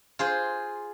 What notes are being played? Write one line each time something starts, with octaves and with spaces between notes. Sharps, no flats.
F4 G#4 C5